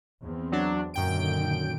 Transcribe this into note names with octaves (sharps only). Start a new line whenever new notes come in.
E2 C4
F#3 D4
F#2 A#2 D3 D#3 G5 D7